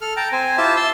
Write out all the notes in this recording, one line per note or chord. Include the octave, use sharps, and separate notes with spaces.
A4 F6
G5 A5 A#5
C4 C5 G#5
E4 F4 G4 C5 E5 A5
A5 C6 E6